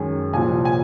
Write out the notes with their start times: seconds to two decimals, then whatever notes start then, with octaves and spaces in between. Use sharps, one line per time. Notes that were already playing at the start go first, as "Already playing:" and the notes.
Already playing: F#2 D#3 G#3 G#5
0.33 C2 A#2 F3 G#5
0.65 G#5